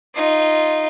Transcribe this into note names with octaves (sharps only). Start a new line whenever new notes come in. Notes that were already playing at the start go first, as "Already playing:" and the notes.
D#4 F4